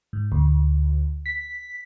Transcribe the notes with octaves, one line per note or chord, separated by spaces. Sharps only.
G#2
D2
B6